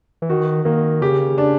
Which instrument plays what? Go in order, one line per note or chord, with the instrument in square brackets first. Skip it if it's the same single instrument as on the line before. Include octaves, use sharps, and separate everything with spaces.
[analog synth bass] E3
[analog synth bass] D#3 [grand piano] F#4
[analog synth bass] D#3 [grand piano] A#3
[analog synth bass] C#3 [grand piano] G4
[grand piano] D4